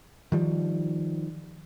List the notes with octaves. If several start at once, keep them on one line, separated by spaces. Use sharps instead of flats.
D#3 F3 G3